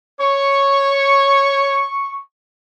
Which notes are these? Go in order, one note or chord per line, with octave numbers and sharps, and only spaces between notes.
C#5 C#6